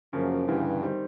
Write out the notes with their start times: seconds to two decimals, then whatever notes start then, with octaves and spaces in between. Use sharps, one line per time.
0.13 F#2 C#3 F3 A#3
0.48 D2 G2 C#3 E3
0.83 D#3 G3 C4